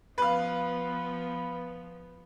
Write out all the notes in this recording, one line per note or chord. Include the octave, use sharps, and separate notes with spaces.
F3 B3 B4 F5